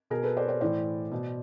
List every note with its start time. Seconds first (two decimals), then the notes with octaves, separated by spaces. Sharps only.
0.10 B2 G#4 A#4
0.23 A4 B4
0.37 C5 D5
0.48 C5 D5
0.61 A2 E3 C5 D5
1.11 B2